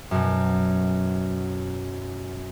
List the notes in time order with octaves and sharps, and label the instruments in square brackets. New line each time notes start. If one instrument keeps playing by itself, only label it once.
[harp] F#2 B2